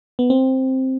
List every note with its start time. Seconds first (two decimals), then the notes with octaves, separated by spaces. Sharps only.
0.19 B3
0.30 C4